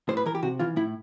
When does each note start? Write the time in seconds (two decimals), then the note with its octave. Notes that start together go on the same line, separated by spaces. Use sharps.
0.09 A2 C5
0.17 B4
0.26 E3 A#4
0.35 G4
0.43 C3 F#4
0.59 E3 F4
0.76 A2 E4